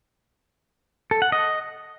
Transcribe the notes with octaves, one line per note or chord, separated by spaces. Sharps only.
A4
F#5
D#5